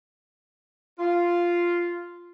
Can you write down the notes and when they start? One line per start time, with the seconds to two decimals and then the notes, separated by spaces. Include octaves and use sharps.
0.99 F4